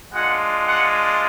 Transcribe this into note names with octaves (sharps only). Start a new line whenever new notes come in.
G#3 D4 F4 F#5
F#5